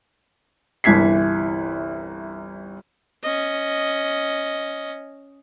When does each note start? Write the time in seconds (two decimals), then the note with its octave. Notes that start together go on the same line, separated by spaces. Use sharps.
0.84 G1 C2 E3 G#6 B6 C7
3.23 C#4 D#5